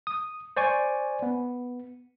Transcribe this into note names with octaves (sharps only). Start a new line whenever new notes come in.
D#6
C5 D5 G#5 C#6
B3